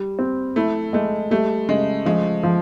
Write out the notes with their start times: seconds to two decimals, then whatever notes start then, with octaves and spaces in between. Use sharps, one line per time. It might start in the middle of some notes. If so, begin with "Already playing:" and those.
Already playing: G3
0.19 C4
0.56 A3 E4
0.93 G#3 A3
1.31 G3 A3
1.69 C#3 G#3
2.06 F3 G#3
2.43 F3